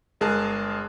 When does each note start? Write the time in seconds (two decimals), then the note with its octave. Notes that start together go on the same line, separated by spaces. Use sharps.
0.21 G1 G#3 G#4 A#4 A5 F#6